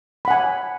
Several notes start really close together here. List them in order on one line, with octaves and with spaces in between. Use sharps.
B5 F#5 G#5